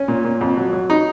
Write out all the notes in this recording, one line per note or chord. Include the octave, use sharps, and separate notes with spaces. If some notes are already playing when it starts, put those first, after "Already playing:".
Already playing: C#4
A#2
A#2
F2
F#3
F#3
D#4